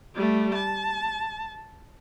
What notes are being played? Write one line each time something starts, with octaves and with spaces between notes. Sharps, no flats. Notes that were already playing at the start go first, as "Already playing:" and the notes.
G3 A3
A5